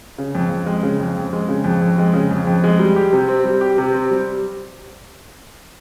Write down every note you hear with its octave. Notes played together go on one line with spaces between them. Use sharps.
C#3
F2
F2
G#3
C#3
F2
F2
G#3
C#3
F2
F2
G#3
C#3
F2
F2
G#3
G3
G4
C3
C4
G3
G4
C3
C4
G3